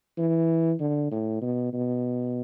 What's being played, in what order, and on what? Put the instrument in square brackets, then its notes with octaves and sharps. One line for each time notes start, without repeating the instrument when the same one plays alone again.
[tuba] E3
D3
A2
B2
B2